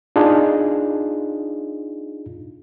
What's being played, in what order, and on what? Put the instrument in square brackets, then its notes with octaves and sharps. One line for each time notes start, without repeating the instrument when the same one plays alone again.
[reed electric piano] D4 D#4 F4 G#4